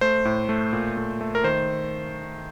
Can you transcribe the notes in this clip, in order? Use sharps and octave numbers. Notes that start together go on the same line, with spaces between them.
A3 C5
A2
A3
A#2
A3
A3
A#4
D#3 C5